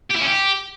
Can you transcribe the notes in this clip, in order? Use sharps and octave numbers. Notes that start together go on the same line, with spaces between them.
G4
E4
C#4
G4